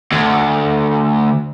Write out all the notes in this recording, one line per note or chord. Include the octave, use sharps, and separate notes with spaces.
D2